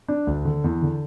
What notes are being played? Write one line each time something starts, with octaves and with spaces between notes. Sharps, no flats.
D4
D2
D3
E2
D3